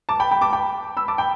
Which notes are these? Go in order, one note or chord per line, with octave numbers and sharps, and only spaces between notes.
A5 D6
G5 B5
G5 B5
A5 D6
G5 B5
B5 E6
A5 D6
G5 B5